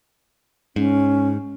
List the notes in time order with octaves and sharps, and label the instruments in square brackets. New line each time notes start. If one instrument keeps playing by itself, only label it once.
[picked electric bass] G#2 [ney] C#4